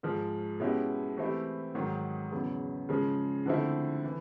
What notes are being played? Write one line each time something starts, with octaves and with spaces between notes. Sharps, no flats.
G#2 F3 G#3
B2 G#3 C#4 E4 G4
E3 A3 C4 E4 G4
G#2 D#3 F#3
E2 C#3 F#3
C#3 F3 G#3
D3 F3 A3 C4 E4
E3